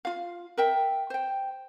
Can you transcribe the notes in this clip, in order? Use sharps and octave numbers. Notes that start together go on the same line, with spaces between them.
F4 F5
A#4 E5 G5
C5 G5